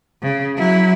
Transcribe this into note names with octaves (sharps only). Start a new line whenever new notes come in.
C#3
F#3 E4